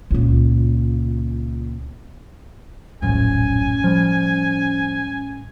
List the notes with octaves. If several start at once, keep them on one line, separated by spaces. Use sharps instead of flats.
C#2 A#2
D#1 A#1 F#2 A2 C#4 G#5
F3 G3